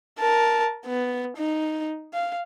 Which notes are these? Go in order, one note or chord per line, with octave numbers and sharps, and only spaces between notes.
A#4 A5
B3
D#4
F5